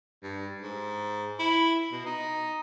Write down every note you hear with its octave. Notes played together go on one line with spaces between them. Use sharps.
G2
G#2
E4
B2
D#4